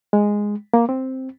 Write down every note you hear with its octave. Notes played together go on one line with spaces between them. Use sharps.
G#3
A#3
C4